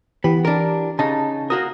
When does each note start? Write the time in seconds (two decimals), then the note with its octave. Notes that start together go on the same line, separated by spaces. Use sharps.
0.24 E3 B3 G4
0.45 D4 A#4
0.99 C#3 D#4 A5
1.50 A#3 F#4 A#4 D#6